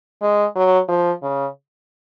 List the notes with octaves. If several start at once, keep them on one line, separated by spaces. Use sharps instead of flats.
G#3
F#3
F3
C#3